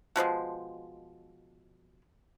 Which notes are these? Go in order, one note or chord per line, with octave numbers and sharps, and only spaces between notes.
B2 F3 F#3 G#3